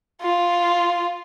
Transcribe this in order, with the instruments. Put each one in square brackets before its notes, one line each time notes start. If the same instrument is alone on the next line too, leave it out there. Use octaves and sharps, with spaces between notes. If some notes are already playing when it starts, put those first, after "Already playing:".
[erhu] F4